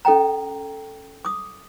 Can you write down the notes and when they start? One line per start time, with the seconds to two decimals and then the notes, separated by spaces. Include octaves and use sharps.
0.05 C#4 A4 D#5 G5 A#5
1.25 D6 D#6